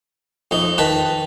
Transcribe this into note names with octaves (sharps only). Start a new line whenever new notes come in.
F2 D#4
D#3 B4 A5